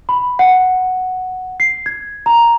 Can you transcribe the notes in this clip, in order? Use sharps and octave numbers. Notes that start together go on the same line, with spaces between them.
B5
F#5
C7
G#6
A#5